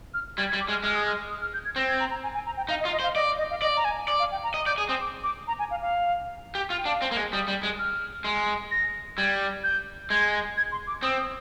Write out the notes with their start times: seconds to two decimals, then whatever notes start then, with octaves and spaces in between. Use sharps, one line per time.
0.14 F6
0.37 G3 G#6
0.49 G#6
0.53 G3
0.61 D6
0.69 G#3
0.72 F6
0.83 G#3 F6
0.95 D#6
1.06 F6
1.30 D#6
1.41 F6
1.54 G6
1.65 G#6
1.76 C4 A#6
1.88 G#6
2.00 A#5
2.11 A#5
2.23 G#5
2.34 G#5
2.46 A#5
2.57 G5
2.69 D#4 F5
2.80 D#5
2.85 F4
2.92 D#5
3.00 C5
3.03 F5
3.15 D5 D#5
3.38 D#5
3.50 F5
3.62 D5 D#5
3.77 A#5
3.85 G#5
4.08 D5
4.19 F5
4.31 G5
4.43 A#5
4.54 D#5
4.66 D5 G6
4.78 G#4 D#6
4.89 C4 D#6
5.00 D6
5.23 D6
5.48 A#5
5.59 G#5
5.71 F5
5.82 F5
6.55 G4
6.70 F4
6.78 G5
6.85 D4 F5
7.02 C4
7.11 A#3
7.17 G#3
7.33 G3 D#6
7.48 G3
7.63 G#3
7.79 F6
8.24 G#3
8.71 A#6
9.17 G3 G#6
9.64 G6
10.10 G#3 G#6
10.57 G#6
10.72 C6
10.87 D6
11.03 C4 D#6
11.19 D#6